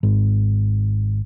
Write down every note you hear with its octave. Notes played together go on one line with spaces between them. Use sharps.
G#1